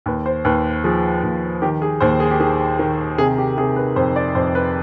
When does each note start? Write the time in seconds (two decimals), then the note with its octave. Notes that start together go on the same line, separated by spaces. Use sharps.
0.06 D#2 B4
0.26 C5
0.45 D#2 B4
0.84 F3 G#4
1.23 D#2
1.62 D#3 G4
1.82 G#4
2.00 D#2 C5
2.20 G#4
2.31 G4
2.40 D#3 G#4
2.79 D#3
3.18 C3 G#4
3.38 G4
3.57 C3 G#4
3.76 B4
3.96 F2 C5
4.16 D5
4.35 F2 C5
4.55 B4